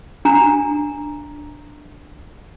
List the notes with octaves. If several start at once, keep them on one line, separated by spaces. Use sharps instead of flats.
D4 A#5